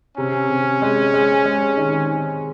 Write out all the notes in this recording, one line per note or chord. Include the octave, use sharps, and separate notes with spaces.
C3 C#4
C3
G#3
G#3
G#3
D#3